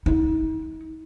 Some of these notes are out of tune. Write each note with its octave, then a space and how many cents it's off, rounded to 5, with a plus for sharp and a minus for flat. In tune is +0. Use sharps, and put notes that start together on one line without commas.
D#4 +40